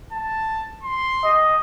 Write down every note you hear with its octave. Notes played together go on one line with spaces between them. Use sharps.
A5
C6
G4 D#5